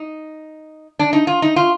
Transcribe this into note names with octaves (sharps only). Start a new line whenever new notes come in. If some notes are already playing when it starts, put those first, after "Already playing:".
Already playing: D#4
D4
D#4
F4
D#4
F4